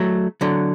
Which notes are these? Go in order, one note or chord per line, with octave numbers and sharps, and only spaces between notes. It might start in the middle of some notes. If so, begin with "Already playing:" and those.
Already playing: F#3 A3
D3 F#3